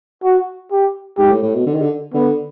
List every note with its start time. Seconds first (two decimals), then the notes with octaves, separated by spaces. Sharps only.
0.24 F#4
0.72 G4
1.18 G#2 G4
1.31 A2
1.43 A2
1.55 B2
1.67 D3
1.74 D#3
1.82 D3
2.14 D3 B3